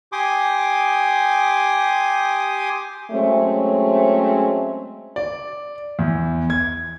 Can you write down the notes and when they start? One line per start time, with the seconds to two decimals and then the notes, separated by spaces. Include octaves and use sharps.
0.12 G4 G#5 C6 D6 D#6
3.11 F#3 G#3 A3 C4 C#4
5.16 D5
5.99 E2
6.50 G#6